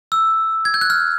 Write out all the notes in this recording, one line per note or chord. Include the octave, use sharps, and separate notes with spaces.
E6
G#6
G6
F#6
F6